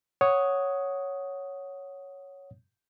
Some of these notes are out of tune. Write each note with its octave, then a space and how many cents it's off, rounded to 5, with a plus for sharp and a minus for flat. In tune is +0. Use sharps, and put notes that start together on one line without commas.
C#5 +0 F#5 +0 D#6 +5